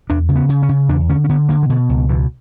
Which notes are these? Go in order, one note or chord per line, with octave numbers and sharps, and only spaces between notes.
E2 D4
C#3
B3
C#3
C#4
C#3
E2 D4
D3 C#4
C#4
D3 B3
D3 A#3
E3
B2 D3
C#2
B2 E3